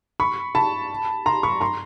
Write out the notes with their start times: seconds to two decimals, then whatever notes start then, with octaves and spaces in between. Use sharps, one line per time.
0.20 B5 C#6
0.55 A5 B5
1.26 A#5 C6
1.43 B5 C#6
1.61 A#5 C6